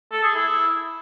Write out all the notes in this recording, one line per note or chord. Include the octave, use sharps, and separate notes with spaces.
A4
G#4
E4